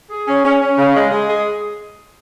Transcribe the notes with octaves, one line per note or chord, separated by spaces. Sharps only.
G#4
C#4
C#4
C#4
C#3
G#3
G#3
G#4